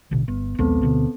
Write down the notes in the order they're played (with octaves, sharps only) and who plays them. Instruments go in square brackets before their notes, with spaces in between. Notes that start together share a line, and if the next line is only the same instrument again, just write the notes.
[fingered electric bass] A1 B2 D3
[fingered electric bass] G1 [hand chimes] B3
[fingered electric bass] A#1 D#2 G#3 [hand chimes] B3 C4 A4
[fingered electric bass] D2 B2 D3